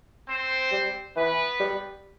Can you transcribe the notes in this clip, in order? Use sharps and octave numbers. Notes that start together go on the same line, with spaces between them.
C4 C5
G3
E3 B3 B4
G3